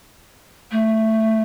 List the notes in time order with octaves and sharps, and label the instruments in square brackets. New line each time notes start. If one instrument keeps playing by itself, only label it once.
[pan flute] A3